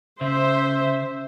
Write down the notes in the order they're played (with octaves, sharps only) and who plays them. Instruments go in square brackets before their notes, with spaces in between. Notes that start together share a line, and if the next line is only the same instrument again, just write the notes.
[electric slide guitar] C#3 [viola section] C5 E5